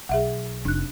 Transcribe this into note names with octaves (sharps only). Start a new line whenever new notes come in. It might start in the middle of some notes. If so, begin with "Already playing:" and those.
B1 G#4 E5 F#5
F1 D4 F#6